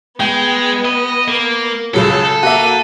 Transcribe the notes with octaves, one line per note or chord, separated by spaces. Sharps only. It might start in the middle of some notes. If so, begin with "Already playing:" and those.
G#3 B3 G5
D#5
A#3
C#2 C#3 F#3 A4
A#3 F#4 E5 D#7